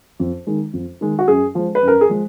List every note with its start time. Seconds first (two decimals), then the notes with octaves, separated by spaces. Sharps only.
0.20 F2
0.47 D#3 G#3
0.73 F2
1.01 D#3 G#3
1.19 F#4
1.28 F#2 G#4
1.55 F3 G#3
1.75 B4
1.83 F#2
1.88 A#4
2.01 G#4
2.09 F3 G#3